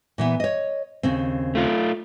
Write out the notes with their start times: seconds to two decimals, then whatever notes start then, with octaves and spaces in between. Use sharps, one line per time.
0.18 A#2 E3 B3
0.40 C#5 D#5
1.03 D#2 C#3 C4
1.55 A3 F4